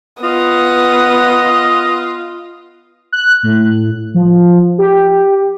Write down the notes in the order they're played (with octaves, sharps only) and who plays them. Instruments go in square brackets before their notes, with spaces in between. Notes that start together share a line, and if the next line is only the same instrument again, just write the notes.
[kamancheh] B3 D#6 [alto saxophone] F4 [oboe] D#5
[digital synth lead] F#6
A2
F3
G4